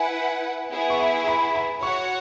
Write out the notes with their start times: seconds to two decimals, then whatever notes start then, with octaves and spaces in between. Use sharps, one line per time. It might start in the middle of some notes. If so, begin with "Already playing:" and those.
Already playing: E4 B4 F#5 G#5
0.73 B3 E4 G#4
0.90 C#6
1.00 B5
1.28 B5
1.55 B5
1.83 F#4 C#5 F#5 C#6